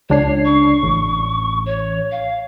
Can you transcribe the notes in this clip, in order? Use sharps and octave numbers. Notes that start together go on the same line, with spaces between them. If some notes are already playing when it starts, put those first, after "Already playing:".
C#2 D4 C#5 C7
C#6
A1
C#5
F5